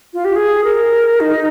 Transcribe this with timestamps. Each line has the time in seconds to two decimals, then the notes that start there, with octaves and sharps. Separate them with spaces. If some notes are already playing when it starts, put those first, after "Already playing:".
0.14 F4
0.25 G4
0.36 G#4
0.64 A#4
1.20 D#4